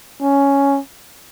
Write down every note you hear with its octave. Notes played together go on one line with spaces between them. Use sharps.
C#4